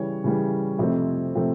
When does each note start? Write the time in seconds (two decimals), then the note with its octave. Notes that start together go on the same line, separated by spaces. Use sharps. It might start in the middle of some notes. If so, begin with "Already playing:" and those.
Already playing: C#3 E3 G3 C#5
0.24 C#3 E3 G3
0.78 F2 C3 F3 A3 C4
1.35 C3 F3 A3 C4